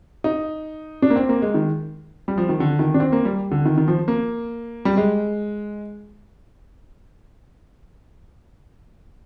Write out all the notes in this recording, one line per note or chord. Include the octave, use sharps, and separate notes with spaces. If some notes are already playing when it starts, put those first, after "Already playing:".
D#4
D4
A#3
C4
A#3
G#3
D#3
G3
F3
D#3
D3
D#3
D4
C4
A#3
G3
D3
D#3
D#3
F3
A#3
G3
G#3